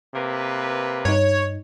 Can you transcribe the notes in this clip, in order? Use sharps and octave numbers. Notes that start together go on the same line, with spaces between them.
C3 A#3 B4
G2 D#4 C#5